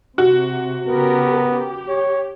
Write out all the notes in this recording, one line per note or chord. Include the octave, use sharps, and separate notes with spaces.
C3 F#4
C#3 B3 G4 A#4
G4
C#5